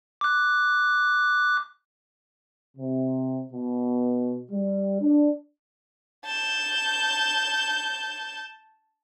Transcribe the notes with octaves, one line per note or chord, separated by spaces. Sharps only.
D6 F#6
C3
B2
G3
D4
A5 G6